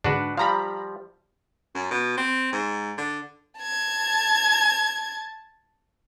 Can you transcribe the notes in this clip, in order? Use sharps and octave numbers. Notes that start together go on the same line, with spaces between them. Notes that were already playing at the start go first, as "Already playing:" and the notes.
G#2 D3 D4 F#4 B4
F3 G3 F5 A#5 B5
F#2
B2
C4
G#2
D3
A5 G#6